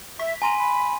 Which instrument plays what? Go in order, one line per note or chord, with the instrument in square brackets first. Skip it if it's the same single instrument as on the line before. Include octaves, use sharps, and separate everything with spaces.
[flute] E5 [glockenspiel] C#6 B6
[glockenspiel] G#5 C6 D#7 [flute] A#5
[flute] B5